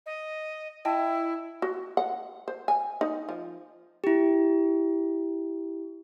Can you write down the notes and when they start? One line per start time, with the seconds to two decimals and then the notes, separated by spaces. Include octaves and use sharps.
0.06 D#5
0.85 E4 D#5 G5 A5
1.62 F#4
1.97 F#5
2.48 C5
2.68 G#5
3.01 D#4
3.29 F3
4.04 E4 G4